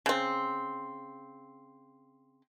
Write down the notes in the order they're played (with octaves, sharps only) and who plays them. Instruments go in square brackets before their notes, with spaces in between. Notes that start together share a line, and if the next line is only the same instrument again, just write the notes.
[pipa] C#3 C4